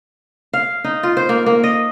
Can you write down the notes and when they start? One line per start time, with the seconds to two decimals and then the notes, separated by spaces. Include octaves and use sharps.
0.53 F5
0.84 D#4
1.03 F4
1.17 C5
1.29 A#3
1.46 A#3
1.64 D#5